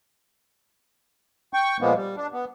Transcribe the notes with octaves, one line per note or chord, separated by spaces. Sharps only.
G5 C#6
A#2 F3 G#3 A#3 B3
G3
D4
B3